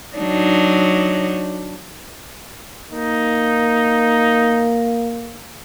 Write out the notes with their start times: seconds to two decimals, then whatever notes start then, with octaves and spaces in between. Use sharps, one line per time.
0.17 F#3 D4 D#4
2.92 A#3 D#4